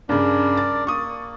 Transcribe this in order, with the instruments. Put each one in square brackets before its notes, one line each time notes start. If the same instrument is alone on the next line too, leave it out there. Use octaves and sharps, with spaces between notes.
[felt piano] G2 C#3 [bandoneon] D4 A#4 D5
[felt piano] A6
[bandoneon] A#3 [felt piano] C#6 D#6